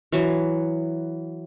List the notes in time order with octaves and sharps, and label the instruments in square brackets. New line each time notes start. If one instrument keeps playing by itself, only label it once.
[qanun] E3 F#3